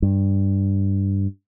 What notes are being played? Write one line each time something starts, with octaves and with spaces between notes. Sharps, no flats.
G2